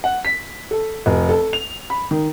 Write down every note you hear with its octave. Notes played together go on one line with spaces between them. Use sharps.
F#5
B6
A4
F1
A4
F7
B5
D#3